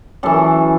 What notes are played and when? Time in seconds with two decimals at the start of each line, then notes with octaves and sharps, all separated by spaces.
0.23 F#2 E3 A4